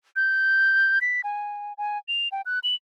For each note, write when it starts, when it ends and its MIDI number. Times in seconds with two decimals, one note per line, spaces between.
0.16 0.99 91
1.01 1.21 95
1.24 1.73 80
1.78 1.98 80
2.08 2.28 101
2.32 2.42 79
2.46 2.59 90
2.64 2.75 102